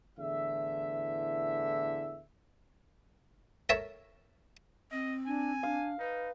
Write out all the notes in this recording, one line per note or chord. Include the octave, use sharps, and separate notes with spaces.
E2 A2 D3 E3 E5
A4 A#4 C#5 E5 A5
C4 D#5
D4 G#5
D4 F5
D#4 B4